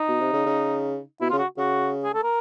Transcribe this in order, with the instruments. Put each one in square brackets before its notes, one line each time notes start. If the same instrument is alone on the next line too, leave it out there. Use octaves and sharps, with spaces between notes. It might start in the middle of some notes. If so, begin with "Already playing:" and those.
Already playing: [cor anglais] D#4
[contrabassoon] B2
C3
C#3
C#3
[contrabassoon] B2 [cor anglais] E4
[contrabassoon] C#3 [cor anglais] F4
[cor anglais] F#4
[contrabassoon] C#3 [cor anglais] F#4
[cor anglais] G#4
A4
A#4